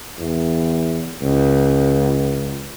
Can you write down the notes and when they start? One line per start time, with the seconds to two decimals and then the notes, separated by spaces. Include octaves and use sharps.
0.18 E2
1.21 C#2